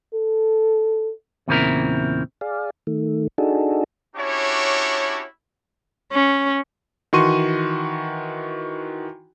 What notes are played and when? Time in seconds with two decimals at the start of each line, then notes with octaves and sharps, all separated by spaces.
0.14 A4
1.48 E2 A#2 C#3 C4 E4 A#4
2.41 G#4 D5 F5
2.87 D#3 A3
3.38 D4 D#4 F#4 G#4 A4
4.16 C#4 D4 E4 F#4 G4 C#5
6.12 C#4
7.13 D#3 E3 F#4 C6 C#6 D#7